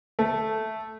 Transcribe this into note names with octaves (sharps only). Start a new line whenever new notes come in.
A3